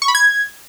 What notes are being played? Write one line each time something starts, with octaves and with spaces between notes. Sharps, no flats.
C#6
B5
G#6